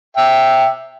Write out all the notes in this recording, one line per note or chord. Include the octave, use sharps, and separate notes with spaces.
E5 G5